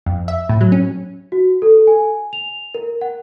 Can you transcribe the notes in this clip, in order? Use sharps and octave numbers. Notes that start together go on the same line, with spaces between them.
F2
E5
A2
F#3
C#4
F#4
A4
G#5
F7
A#4
F#5